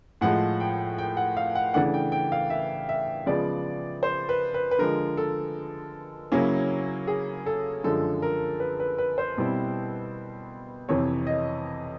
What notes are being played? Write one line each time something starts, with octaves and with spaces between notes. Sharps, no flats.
A2 F3 G#3 F#5
G5
G5
F#5
F5
F#5
C#3 E3 A3 D4 F#5
G5
G5
F5
E5
E5
C#3 F3 G#3 B3 D5
C5
B4
B4
B4
D3 F3 G#3 A#4
A4
C#3 F#3 A#3 C#4 E4
G#4
A4
F#2 D3 F3 G#3 A4
A#4
B4
B4
B4
C5
B2 G3 C4 E4
F2 C3 E3 C#5
D#5